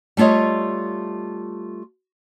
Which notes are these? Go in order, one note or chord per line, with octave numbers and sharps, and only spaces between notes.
G3 A3 F4 C#5 D#5